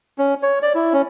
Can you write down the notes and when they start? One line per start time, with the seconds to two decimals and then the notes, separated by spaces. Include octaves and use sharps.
0.18 C#4
0.43 C#5
0.62 D5
0.75 E4
0.93 C#4